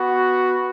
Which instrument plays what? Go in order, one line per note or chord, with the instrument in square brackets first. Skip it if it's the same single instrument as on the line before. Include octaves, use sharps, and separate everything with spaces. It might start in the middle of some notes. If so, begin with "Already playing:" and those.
Already playing: [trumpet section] B3 F#4